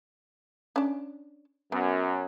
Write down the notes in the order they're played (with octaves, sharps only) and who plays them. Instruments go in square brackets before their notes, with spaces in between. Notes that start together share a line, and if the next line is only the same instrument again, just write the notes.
[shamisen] C#4 D4
[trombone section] F#2 [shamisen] B3